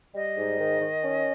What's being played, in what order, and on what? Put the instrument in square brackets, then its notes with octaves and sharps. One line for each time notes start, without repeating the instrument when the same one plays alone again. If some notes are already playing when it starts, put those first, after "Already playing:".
[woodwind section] G3 [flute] D#5
[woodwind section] G#2
D#3
D#3
C#4